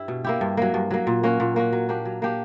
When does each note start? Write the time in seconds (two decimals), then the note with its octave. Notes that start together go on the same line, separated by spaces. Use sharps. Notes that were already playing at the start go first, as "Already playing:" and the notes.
Already playing: G2 G3 E4
0.08 B2
0.24 A#3 E4 G4
0.41 G2
0.57 F#3 A#3
0.74 G2
0.91 F#3 A#3
1.07 A#2
1.23 A#3 C#4 F#4
1.40 A#2
1.56 A#3 C#4 F#4
1.73 F#3
1.89 A#3 D4 G4
2.05 F#3
2.22 A#3 D4 G4